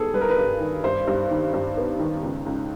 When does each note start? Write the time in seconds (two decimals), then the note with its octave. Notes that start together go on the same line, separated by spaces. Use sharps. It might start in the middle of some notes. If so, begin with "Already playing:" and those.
Already playing: D#3 G3 B3 G#4 A4
0.14 G3 B4
0.21 A#4
0.29 B4
0.38 G2
0.60 D#3
0.84 G2 C5
1.07 G2
1.31 D#3
1.54 G2
1.77 B3
1.99 D#3
2.23 C#2
2.46 C#2